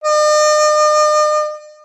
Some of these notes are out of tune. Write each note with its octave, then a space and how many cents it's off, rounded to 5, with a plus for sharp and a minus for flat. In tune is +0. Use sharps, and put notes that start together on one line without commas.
D#5 -45